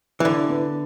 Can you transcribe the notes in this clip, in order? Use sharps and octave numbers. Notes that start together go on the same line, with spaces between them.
E3
D3 E4
B3